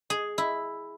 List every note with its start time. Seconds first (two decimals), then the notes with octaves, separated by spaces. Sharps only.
0.10 G#4
0.38 E4